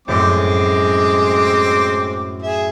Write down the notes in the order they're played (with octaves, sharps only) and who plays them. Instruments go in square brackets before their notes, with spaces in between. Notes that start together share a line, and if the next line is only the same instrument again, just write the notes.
[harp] F#2 A2 [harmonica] G#3 C4 D6
[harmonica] G#4 E5